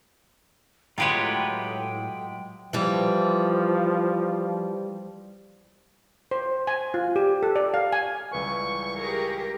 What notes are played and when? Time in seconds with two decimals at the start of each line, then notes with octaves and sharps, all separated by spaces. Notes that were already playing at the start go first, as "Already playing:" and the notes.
0.98 A2 F#3 G#3 F4 G4 B4 C#5 G5
2.73 E3 F3 G3
6.31 C5
6.67 G#5
6.94 F4
7.16 G4
7.43 A4
7.56 D5
7.74 F5
7.93 G#5
8.31 C#2 E3 G3 B4 G#5 C#6
8.97 G4 G#4 A#4